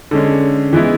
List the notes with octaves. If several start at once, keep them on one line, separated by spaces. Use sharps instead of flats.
D3 G#3 C#4
E3 G#3 B3 E4